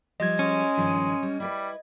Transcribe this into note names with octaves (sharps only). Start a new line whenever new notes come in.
F3 G3 D#5 G#6
G#3 C#4
G2 D#3 F3
G3
G3 E4 A#4 B4